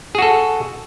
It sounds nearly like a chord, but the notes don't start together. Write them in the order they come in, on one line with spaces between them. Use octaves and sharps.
G#4 F#4 A4